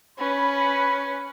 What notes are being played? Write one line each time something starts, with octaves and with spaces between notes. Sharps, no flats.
C#4 B4 B5